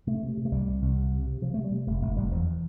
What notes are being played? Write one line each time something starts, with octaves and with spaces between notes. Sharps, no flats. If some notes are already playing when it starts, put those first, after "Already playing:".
C3 A3
C3
C3
A3
C2 G3
C3
C2
C3
C3
C3
C3 F3
C3 A3
G3
C3
F1 A3
F1 A3
F1 G3
E2 F3